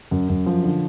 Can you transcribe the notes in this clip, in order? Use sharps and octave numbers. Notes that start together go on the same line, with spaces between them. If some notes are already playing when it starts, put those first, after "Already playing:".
F#2
F#2
F3
D3